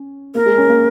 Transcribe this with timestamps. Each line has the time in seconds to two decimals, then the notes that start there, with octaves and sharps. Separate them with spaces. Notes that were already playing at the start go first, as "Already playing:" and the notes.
Already playing: C#4
0.35 A#3 A#4
0.46 G#3
0.58 C#4
0.69 A#3